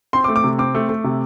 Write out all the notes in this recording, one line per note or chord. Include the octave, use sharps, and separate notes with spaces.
C4 C6
D6
A3
D6
C3
C4 D6
A3
A3
C3